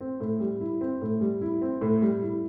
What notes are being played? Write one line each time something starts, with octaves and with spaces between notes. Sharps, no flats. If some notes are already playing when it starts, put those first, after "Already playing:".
C4
A2
G3
E4
C4
A2
G3
E4
C4
A2
G3
E4